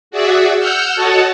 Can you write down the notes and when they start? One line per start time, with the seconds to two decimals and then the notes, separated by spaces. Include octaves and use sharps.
0.11 F#4 G#4 D5 E5 F#5
0.58 F#5 E6 F6 G6
0.96 F#4 A4 C#5 D#5 F#5 A5